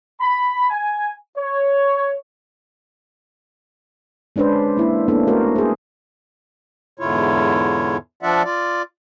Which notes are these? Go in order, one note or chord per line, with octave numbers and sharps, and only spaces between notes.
B5
G#5
C#5
G#3 C#4 D4 B4 C5
A#3 E4
A#3 B3 C#4 D4 A4
A3 F#4 A#4 C5
G#4 C5
E2 G#2 D3 E4 F4 C#5
F3 D4 F4 D5 E5 F#5
F4 D5